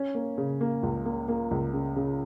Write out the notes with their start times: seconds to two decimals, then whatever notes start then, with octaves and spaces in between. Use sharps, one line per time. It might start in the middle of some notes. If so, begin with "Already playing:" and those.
Already playing: C#4
0.15 A#3
0.38 C#3
0.61 A#3
0.83 C#2
1.06 A#3
1.28 A#3
1.51 C#2
1.74 C#3
1.96 C#3